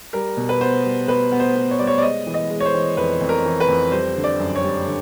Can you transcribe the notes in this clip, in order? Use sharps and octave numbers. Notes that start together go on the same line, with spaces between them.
G3 A#4
B2
B4
B3 C5
G3
B2 B4
B3
C5
B3
C#5
G3 D5
C#5
D5
G#3 D#5
E3
D#5
G#3
C#5
C5
E3
F2 B4
F2
A#4
E3
B4
F2
G3 C5
D3
D5
F#2
C#5
G3
D3